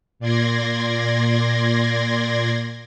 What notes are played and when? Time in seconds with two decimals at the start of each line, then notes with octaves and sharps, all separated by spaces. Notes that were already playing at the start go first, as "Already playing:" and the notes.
0.19 A#2 D5 C6 G#6 A#6